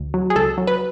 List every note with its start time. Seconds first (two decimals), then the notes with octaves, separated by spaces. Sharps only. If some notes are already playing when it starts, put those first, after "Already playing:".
Already playing: D2
0.14 F#3
0.30 G#4
0.35 C#2 A4
0.58 F#3
0.67 B4